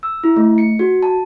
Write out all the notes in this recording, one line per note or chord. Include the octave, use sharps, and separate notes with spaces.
E6
E4
A3
C#7
F#4
A5